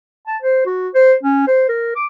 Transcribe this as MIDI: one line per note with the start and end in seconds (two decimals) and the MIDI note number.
0.27 0.37 81
0.42 0.64 72
0.66 0.89 66
0.94 1.14 72
1.23 1.45 61
1.47 1.67 72
1.69 1.92 70
1.96 2.06 86